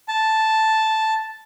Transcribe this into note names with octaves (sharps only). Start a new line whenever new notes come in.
A5